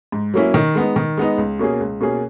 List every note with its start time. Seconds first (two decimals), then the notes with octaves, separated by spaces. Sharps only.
0.12 G#2
0.34 F#3 A#3 C#4 E4
0.54 D#3
0.75 G#3 B3 D#4
0.96 D#3
1.17 G#3 B3 D#4
1.38 C#2
1.59 B2 A#3 C#4 G#4
1.80 C#2
2.00 B2 A#3 C#4 G#4